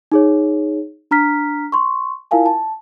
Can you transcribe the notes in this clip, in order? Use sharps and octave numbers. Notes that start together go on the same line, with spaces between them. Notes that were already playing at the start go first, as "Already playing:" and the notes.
D#4 G#4 C#5
D4 A#5 F6 B6
C6 C#6
E4 F4 A#4 F5 G#5 A5
A5